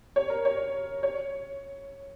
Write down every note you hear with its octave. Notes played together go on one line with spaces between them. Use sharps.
C#5
A#4
C#5
C#5